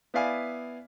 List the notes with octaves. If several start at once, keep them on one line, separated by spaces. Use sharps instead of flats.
B3 E4 D5 E5 F5 G#5